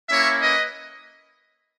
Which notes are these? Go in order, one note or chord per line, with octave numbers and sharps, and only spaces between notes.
A#3 C#4 E4 C#5 E5
B4 D#5